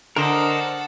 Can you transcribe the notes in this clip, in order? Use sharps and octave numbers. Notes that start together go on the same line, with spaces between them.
D3 A4 A#4 C5 D#5 F#5